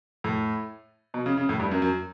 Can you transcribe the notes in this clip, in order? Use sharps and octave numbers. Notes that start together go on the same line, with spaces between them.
A2
B2
C#3
C#3
A2
G2
F#2
F#2